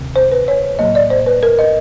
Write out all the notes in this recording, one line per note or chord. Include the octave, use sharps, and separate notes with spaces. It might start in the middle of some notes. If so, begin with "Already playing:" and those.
Already playing: D2 C3 D#3
C5
B4
C#5
A2 F#3 A#3 D#5
D5
C5
B4
A#4
D#5